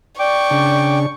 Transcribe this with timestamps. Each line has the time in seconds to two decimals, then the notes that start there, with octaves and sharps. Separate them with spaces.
0.19 D5 G5 C#6 D6
0.51 C#3 D4